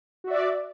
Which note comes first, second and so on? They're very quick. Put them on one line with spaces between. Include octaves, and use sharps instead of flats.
F#4 E5 D5